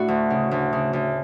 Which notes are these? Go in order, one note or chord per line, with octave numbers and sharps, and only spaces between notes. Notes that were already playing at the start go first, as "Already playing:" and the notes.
Already playing: A2 D4 E4 F#4
D2
C#3
D2
C#3
D2